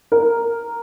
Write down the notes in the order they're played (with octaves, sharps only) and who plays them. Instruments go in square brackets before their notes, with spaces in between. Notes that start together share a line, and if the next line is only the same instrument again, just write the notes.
[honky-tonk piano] A#4